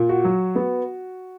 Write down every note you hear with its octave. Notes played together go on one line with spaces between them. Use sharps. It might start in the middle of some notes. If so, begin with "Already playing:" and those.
Already playing: A#2
F#4
F#3
B3